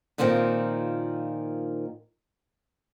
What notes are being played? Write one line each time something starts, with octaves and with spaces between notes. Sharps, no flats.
A#2 D#3 F3 A#3 C4